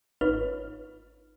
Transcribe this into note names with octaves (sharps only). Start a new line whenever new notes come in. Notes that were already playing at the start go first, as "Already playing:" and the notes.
G#1 D#4 F4 B4 C#5 F6